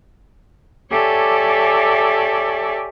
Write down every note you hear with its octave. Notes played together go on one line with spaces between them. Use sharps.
G4 A4 C#5 D5 E5 G#5